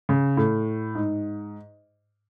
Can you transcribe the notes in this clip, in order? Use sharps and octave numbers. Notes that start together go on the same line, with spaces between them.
C#3
A2
G#2